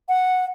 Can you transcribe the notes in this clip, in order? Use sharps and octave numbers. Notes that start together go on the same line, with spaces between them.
F#5